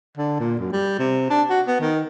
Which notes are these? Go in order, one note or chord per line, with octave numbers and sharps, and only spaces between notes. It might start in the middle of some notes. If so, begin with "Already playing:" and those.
D3
A#2
F#2
G3
C3
D4
F#4
B3
D#3